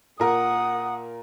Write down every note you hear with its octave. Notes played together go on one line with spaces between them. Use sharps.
A#2 A#4 F#5 D#6